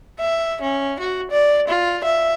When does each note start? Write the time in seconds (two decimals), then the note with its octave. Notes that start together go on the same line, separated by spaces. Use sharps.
0.20 E5
0.62 C#4
1.00 F#4
1.31 D5
1.68 F4
2.04 E5